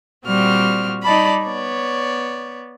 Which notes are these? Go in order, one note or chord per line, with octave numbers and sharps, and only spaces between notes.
A#2 G3 C4 F#4 F6
G3 D#4 D5 A5 B5
B3 C#5 D5